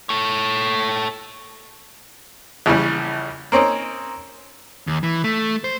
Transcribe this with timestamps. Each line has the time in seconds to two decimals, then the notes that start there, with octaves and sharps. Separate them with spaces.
0.09 A4 C#5
2.66 A#1 C#3 E3 G3
3.52 A#3 C4 C#4 D#4
4.87 D#2
5.03 E3
5.24 A3
5.64 C5